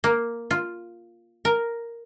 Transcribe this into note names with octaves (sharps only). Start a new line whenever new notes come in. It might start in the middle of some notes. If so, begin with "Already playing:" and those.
A#3
F4
A#4